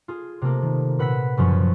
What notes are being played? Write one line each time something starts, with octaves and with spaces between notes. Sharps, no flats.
F4 G#4
C3 A3 A#3
D#3
A#2 B4 F#5 E6 B6
F#1 F#2 F3 C#4